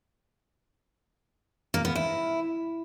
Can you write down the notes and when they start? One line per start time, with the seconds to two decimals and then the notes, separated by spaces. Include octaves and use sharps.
1.74 A#3
1.85 B3
1.95 E4